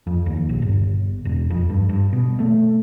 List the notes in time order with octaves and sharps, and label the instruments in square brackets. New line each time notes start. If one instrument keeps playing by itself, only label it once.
[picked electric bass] F2
D#2
A#1
G1
E1
F2
G2
G2
B2
A3